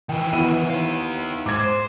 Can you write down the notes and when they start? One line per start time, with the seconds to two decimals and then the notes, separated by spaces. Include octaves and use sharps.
0.09 D#3 E3 G5
0.33 B3 E4 D#7
0.70 D#4 F5
1.46 G#2 D6 G#6
1.60 C5